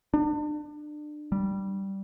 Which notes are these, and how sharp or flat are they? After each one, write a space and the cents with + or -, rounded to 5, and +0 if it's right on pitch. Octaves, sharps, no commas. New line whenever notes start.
D4 +30
G3 -10